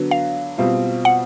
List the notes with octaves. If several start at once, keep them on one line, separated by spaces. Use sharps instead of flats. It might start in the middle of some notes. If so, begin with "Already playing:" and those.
Already playing: D3 F#3 B3
F5
B2 G3 C4 F4
F#5